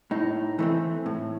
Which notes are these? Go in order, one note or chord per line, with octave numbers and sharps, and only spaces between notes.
A2 D#4
E3 A3 C4
A2